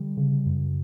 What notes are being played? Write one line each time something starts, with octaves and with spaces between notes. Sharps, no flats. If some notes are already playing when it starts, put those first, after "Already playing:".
Already playing: D3 G3
C#3
F#2